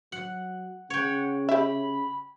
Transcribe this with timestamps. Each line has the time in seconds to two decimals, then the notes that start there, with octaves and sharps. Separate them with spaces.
0.12 F#3 F#5
0.90 C#3 C#5 F#5 G5
1.49 G4 E5 B5